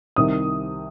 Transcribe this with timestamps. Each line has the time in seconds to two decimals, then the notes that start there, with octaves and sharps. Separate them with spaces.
0.16 C2 C3 D#3 D#6